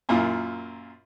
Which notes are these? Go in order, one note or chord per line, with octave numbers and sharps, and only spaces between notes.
F#2 A#2 E4 F4